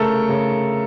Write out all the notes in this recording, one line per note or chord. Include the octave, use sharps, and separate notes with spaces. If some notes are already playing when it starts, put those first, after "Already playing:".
Already playing: C#3 A3 A4 A#4
C#3